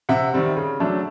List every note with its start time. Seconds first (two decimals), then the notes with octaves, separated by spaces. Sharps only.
0.09 C3 E5 F#5
0.33 D#3 G3 C4
0.57 C#3
0.80 F#3 A3 D4